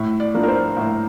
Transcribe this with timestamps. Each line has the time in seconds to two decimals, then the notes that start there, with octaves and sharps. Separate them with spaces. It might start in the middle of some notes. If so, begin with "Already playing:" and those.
Already playing: A2 E5
0.20 D5
0.34 F3 A#3 D4
0.43 A#4
0.48 C5
0.77 A2